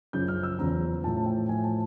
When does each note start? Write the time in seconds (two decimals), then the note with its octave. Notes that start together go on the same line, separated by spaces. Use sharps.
0.13 F#2 C#3 F3 G6
0.28 F6
0.43 E6
0.59 E2 C#3 F3 A#5
1.04 A2 F3 A5
1.26 G5
1.49 A2 F3 G#5
1.64 A5